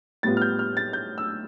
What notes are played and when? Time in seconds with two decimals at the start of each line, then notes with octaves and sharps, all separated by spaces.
0.23 A2 G3 B3 F4 A6
0.37 F6
0.41 G6
0.59 F6
0.77 A6
0.93 G6
1.18 E6